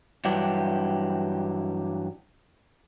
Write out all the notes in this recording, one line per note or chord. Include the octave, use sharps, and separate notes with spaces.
G2 E3 F#3 D4 G4